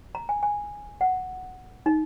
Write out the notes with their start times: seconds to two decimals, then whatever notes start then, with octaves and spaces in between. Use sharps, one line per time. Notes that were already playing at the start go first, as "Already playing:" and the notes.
0.15 A#5
0.29 G#5
0.43 G#5
1.01 F#5
1.86 D#4